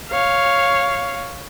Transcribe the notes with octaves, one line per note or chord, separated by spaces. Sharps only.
C#5 F5